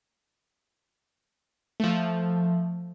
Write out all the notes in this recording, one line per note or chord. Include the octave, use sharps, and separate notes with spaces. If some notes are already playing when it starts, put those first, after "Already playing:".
F3 A3